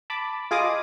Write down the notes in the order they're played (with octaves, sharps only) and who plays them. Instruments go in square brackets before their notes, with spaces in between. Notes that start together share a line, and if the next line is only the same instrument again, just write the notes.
[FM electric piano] A5 B5 D6
F4 G#4 D#5 D6 D#6